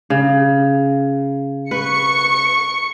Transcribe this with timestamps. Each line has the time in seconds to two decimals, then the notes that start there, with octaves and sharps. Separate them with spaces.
0.10 C#3
1.71 B4 C#6 C#7